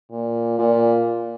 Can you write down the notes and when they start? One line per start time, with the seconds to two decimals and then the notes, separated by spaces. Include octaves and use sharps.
0.11 A#2
0.59 A#2